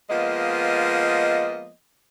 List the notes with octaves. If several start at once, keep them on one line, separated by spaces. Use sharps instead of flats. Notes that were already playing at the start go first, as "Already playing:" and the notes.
F3 G#3 A#3 B3 D#5